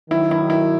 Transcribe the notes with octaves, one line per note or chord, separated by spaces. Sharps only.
D#3 F#3 E4
E4
E4